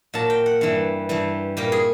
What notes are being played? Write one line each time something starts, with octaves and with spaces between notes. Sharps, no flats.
A#2 F#3 A5
G5
F#5
G2 E3 G3
G2 E3 G3
A#2 G3 G4
G#4